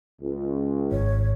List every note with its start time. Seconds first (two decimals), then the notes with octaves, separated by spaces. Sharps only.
0.21 C#2
0.92 G#1 C#5